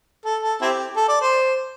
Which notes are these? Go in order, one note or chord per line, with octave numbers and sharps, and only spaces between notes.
A4
A4
C4 E4 G4
A4
D5
C5